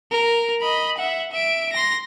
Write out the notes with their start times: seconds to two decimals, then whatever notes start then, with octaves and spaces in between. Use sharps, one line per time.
0.12 A#4
0.61 D#5 B5
0.98 E5 F#5
1.31 E5 D7
1.73 C6 A#6